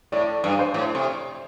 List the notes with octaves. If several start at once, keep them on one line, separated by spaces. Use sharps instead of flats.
A2 D5
G2
C5
A2
C3